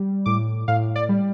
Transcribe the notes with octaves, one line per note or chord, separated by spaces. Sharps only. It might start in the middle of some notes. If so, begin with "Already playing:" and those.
Already playing: G3
A2 D6
A2 F5
D5
G3